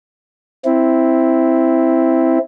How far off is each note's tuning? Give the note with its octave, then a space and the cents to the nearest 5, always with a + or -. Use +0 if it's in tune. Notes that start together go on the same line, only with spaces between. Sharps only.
C4 +0 E4 +0